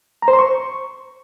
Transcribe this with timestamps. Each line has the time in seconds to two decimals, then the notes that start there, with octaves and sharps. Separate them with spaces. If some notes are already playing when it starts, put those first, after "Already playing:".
0.22 A#5
0.28 C5
0.33 C6
0.39 C#6